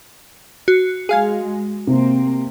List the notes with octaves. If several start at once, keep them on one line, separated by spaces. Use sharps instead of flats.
F#4
G#3 G#4 F5 G#5
C3 A#3 C4